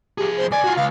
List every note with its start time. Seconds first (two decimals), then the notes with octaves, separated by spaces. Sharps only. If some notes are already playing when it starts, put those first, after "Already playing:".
0.18 F3 G4 G#4
0.37 C5
0.51 C#2 D5 G#5
0.64 F4 F#4
0.76 C#2 F5